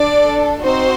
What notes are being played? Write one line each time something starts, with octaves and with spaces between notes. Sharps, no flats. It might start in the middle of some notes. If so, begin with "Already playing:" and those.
Already playing: D4 A4 D5
C4 D#4 F#4 C5